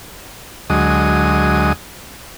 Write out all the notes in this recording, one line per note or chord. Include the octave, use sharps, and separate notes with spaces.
D2 F#3 G#3 D#5